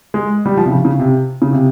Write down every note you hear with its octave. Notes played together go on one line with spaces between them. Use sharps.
G#3
G3
F3
C3
C#3
C#3
C3
C#3
C3